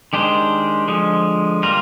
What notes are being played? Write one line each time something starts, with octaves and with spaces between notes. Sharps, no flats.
D#3 G#3 D4 G4 C5
D3 F3 G#3
G3 A#3 F4 A#4